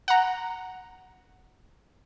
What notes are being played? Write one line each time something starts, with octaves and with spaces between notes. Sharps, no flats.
F#5 A#5